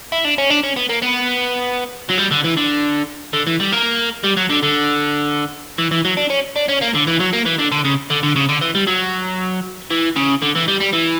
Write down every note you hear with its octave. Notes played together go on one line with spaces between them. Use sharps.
E4
D4
C#4
D4
C#4
B3
A#3
B3
F#3
G3
D3
E3
D3
D3
E3
G3
A#3
G3
F#3
D3
D3
E3
E3
F#3
D4
C#4
D4
C#4
A#3
D3
E3
F#3
A#3
E3
D3
D3
C#3
D3
D3
C#3
D3
E3
G3
F#3
E3
C#3
D3
E3
G3
G3
E3